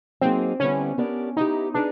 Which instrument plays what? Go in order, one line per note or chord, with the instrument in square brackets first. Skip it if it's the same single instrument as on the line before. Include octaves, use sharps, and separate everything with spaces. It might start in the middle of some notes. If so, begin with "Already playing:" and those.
[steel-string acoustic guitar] F#3 A#3 D#4 G#4 [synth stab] C4
[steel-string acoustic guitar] D3 G3 B3 E4 [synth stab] C#4
[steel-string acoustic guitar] B3 D4 G4 A#4 D5
[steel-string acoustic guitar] B3 E4 G4 [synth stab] D#4
[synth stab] D4 [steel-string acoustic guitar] D#4 G#4 B4